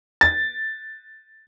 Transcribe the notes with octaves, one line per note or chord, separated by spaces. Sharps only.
A6